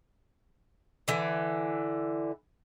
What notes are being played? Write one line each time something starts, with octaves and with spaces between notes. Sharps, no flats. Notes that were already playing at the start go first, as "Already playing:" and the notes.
D3 E3